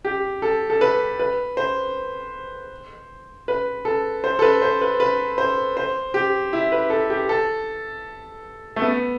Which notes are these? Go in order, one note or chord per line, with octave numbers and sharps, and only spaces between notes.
G4
A4
A4
B4
B4
C5
B4
A4
C5
A4
B4
C5
B4
B4
C5
C5
G4
E4
B4
A4
G4
A4
A3
B3